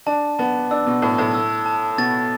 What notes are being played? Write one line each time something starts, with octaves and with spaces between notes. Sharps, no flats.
D4 A5
B3 A5
D4 E6
B2
A2 A5
A2
E6
A5
B2 A6